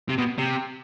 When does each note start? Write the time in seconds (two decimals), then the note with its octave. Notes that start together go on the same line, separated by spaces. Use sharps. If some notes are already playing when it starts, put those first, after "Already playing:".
0.09 C3
0.18 B2
0.38 C3